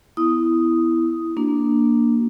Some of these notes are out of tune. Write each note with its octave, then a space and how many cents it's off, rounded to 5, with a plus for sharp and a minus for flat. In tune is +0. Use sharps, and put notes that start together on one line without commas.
B3 +10 E4 +0 D#6 +0
A#3 +0 D4 +0 F#4 +0